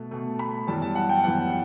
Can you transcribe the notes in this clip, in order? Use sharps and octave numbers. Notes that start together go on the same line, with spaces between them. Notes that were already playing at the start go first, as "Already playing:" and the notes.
Already playing: B2 A3
B2 A3
B5
F#2 E3 G3 B3 A5
A5
F#5
G5
F#2 E3 G3 B3 F#5